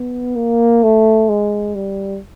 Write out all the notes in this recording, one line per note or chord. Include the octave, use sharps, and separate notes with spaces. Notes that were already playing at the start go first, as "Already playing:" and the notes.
Already playing: B3
A#3
A3
G#3
G3